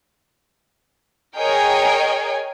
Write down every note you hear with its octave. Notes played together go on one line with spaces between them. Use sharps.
G#4 A#4 C#5 D#5 G5 G#5